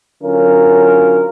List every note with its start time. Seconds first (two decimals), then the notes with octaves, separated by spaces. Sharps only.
0.23 D3 F#3 C#4 F4 A#4